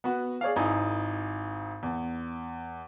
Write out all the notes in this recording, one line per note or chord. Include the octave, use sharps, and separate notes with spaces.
B3 F#4
G#4 C#5 D5 F5
G#1 D#4 E4 G#5
E2